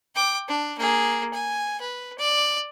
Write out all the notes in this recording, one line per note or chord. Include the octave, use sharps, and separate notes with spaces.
G5 D6
D4
A#3 G#4
G#5
B4
D5